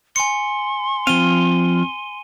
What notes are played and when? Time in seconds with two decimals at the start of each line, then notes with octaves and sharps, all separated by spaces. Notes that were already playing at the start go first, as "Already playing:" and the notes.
0.16 G#5 C6 C#7
1.07 F3 C4 F5 D#7 G7